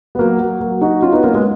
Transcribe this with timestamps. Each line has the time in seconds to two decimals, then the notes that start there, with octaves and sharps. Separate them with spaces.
0.15 B3
0.19 F#3 A#3
0.39 F#3
0.60 F#3 A#3
0.81 D#4 F#4
1.02 C#4 F4
1.13 B3 D#4
1.24 A#3 C#4
1.34 G#3 B3